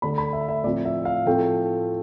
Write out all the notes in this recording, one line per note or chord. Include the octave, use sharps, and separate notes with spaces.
D2 D3 A3 D4 B5
B5
E5
E5
A2 F3 C4 D5
E5
F5
A2 F3 A3 C4 G5